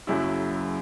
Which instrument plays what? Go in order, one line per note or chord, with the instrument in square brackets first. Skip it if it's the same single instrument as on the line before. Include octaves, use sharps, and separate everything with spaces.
[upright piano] F#1 F#2 C#3 F#3 E4